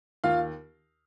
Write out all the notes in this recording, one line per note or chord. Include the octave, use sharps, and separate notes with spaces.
D#2 F4 F5